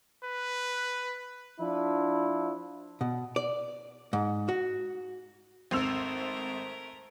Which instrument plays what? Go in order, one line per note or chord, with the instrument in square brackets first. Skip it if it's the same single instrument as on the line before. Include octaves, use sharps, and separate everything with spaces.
[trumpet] B4
[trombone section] F3 D4 E4
[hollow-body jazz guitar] B2
D5
G#2
F#4
[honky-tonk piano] G#1 C5 F7 [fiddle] A3 A#4 [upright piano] C4 E6